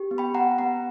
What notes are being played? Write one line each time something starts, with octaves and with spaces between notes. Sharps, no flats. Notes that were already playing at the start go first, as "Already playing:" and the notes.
Already playing: G4
B3
G5 B5
B3 F#5 A#5
B3 F#5 A#5